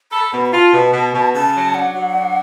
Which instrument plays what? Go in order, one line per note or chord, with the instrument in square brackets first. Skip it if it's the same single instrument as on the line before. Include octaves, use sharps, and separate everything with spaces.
[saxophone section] A4 [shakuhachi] B5
[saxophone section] B2
[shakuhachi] B5
[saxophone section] F4 [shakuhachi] A5
[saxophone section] B2
B2
B2
[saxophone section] C#3 [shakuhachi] A5
[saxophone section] F#3
[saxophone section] D4 [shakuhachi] F#5
[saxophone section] F#3
D4